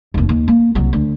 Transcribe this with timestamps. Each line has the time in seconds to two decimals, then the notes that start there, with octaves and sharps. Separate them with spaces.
0.14 F1 D#2
0.29 D#2
0.48 A#3
0.75 C2 F#3
0.93 D2